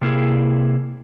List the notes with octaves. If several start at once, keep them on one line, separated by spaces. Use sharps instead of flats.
C3 A#3 E4 G#4